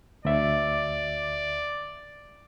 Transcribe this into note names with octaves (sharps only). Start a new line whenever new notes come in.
D2 D5 E5